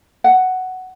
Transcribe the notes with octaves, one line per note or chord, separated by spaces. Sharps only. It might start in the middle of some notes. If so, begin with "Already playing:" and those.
F#5